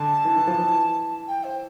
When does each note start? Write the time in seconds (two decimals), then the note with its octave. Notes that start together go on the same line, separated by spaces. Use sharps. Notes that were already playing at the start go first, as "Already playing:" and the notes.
Already playing: D3 A5
0.25 E3
0.36 E3
0.47 F3
0.59 E3
1.27 G5
1.44 C5